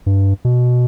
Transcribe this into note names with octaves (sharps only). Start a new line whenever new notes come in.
G2
B2